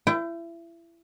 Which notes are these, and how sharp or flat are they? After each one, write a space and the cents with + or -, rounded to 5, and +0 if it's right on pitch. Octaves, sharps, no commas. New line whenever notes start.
E4 +30 G5 -10